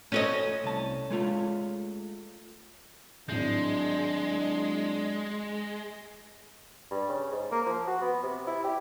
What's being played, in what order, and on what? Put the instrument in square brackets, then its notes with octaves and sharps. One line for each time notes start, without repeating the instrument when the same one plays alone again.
[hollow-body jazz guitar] A3 F#4 C5 [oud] C#4 A4 D#5
[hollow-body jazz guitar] C2 A5
G#3 A3 F4
[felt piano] G#1 A2 G6 [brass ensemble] F#3 D4 [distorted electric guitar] G#3
[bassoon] G2
C#3
G#2
A#3
F3
F#4
B3
C3
E4
G4